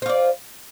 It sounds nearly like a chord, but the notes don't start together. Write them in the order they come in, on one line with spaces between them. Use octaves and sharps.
C5 F4 D5